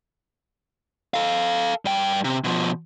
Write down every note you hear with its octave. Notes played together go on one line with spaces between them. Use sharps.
A4 F5
G2 G5
C3
B2 F3